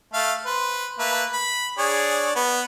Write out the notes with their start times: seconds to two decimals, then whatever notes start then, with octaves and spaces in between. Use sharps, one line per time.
0.14 A3 F5
0.46 B4 C5
0.99 A3 A#3 B4
1.33 B5
1.78 D4 G#4 C#5
2.36 B3